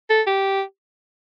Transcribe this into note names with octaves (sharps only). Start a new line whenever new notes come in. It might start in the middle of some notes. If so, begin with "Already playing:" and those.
A4
G4